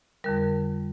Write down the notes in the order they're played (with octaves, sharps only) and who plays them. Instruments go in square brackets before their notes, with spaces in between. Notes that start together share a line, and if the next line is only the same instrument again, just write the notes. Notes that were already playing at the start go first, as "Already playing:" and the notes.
[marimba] F2 D3 G3 A#4